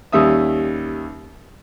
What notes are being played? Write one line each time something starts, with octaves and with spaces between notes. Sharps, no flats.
D#2 G3 C#4 E5 D#6